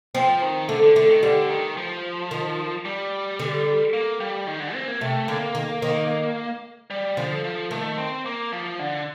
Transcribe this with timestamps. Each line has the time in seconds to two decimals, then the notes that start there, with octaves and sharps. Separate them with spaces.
0.15 F3 C4
0.42 D#3
0.69 D3 A3
0.83 D3
0.96 D3 A3
1.09 D#3
1.23 D3 G3
1.50 D#3
1.77 F3
2.31 D#3
2.85 G3
3.39 D3
3.93 A#3
4.20 G3
4.47 D#3
4.60 D3
4.74 C4
4.88 A#3
5.01 C3 A3
5.28 D3 A#3
5.55 D#3
5.82 D#3
6.90 G3
7.17 D3 F3
7.44 F3
7.71 D#3 A3
7.98 C4
8.26 A#3
8.52 F3
8.79 D3